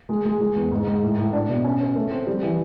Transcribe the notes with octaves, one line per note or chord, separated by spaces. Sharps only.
G#3
G#3
G#3
E2
G#2
G#2
A2
A2
D4
B2
C#4
C#4
A3
C4
G3
E3